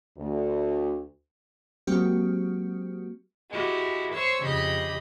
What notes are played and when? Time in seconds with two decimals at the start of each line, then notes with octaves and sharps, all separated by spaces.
0.17 D2
1.87 F#3 G#3 A#3 C4 F#4 G4
3.51 G#3 E4 F#4 G4
4.14 C5 C#5 C#6 E6
4.43 F2 C#3 G4 D#5 B5